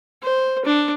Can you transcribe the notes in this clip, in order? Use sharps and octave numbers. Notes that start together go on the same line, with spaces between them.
C5
D4